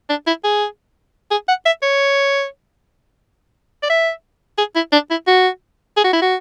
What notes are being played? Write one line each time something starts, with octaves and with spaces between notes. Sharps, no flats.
D4
E4
G#4
G#4
F#5
E5
C#5
D5
E5
G#4
E4
D4
E4
F#4
G#4
F#4
E4
F#4